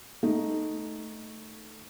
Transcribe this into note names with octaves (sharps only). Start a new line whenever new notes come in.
A3 D#4